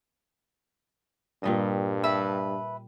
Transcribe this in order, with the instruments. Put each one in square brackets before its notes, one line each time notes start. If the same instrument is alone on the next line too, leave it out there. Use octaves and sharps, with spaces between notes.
[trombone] G2 [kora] A#2 G3 D#5
[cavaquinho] B4 E5 A5